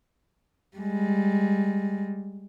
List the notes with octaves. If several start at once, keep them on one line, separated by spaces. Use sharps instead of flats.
G3 G#3